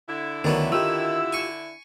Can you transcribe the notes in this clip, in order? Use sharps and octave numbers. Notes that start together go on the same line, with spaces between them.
D3 E4
D2 D#3 F#3 B3 D4
D#3 F4 G4 E6
G#5 C#6